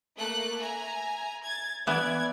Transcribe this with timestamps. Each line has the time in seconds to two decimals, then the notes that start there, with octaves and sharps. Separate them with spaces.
0.17 A3 A#3 F#6
0.60 E5 G#5 A#5
1.44 G#6 A6
1.87 E3 B3 D5 G#6